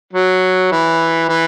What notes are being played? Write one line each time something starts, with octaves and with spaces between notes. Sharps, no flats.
F#3
E3
E3